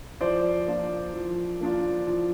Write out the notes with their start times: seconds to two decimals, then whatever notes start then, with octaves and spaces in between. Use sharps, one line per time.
0.21 F3 C5 D5
0.67 A#3 D4 F4
1.14 F3
1.61 A#3 D4 F4
2.07 F3